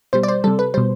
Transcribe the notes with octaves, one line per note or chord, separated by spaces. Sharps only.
B2 G3 C5
D5
C5
C3 G3 A4
B4
B2 G3 C5